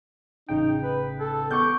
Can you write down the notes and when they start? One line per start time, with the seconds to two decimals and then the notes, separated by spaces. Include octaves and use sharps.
0.49 A1 C#3 D#4 G5
0.83 B4
1.20 A4
1.50 B3 C#6 D6 G6